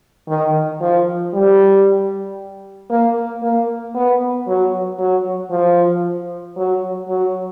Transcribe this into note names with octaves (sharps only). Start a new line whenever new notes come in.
D#3
F3
G3
A#3
A#3
B3
F#3
F#3
F3
F#3
F#3